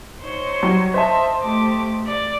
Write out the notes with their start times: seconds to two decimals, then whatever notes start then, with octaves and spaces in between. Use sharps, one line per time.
0.22 D#4 C5 C#5
0.63 F#3 G3
0.94 C5 D#5 E5 A5
1.43 A3 G4 D6
2.07 D5